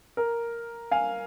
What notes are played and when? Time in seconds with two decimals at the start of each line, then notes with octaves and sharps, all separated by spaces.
0.17 A#4
0.91 F5 G#5